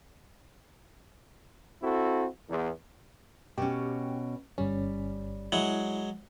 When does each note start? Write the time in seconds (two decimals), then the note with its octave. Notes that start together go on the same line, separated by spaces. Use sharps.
1.83 C4 E4 F#4 A4
2.49 E2
3.58 B2 C#4 G4
4.58 G1 G3 C#4
5.52 F#3 G#3 E4 F#5